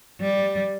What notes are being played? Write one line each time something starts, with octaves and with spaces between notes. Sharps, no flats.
G3